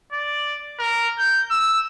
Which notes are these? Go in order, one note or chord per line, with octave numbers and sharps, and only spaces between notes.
D5
A#4
G6
E6